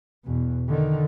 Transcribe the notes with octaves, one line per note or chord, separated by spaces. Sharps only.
E2 B2
D3 D#3